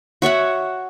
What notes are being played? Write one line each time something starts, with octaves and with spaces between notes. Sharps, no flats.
F#4 C#5 E5 F#5